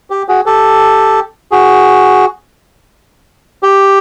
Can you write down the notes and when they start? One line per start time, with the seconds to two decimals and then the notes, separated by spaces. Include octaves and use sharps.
0.10 G4
0.28 F#4 G#4
0.46 G4 A4
1.51 F#4 G#4
3.63 G4